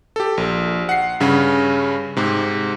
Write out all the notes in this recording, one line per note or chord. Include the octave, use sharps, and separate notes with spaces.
G4 A4
A#1
F#5 C7
G2 C#3 C#4
G#2 C3